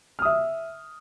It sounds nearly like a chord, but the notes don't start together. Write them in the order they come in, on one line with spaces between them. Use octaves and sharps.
F6 D#6 E5